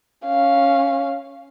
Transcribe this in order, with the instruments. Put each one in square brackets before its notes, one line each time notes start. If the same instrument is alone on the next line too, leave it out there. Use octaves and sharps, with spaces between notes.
[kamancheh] C#4 F5